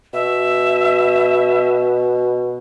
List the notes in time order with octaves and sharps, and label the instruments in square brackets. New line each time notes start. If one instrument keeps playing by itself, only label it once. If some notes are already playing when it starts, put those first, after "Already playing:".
[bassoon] B2 [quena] E5